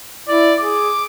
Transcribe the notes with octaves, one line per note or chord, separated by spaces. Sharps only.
E4 D5
G#4 D6